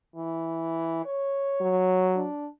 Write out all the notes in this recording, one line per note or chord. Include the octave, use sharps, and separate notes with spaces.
E3
C#5
F#3
D4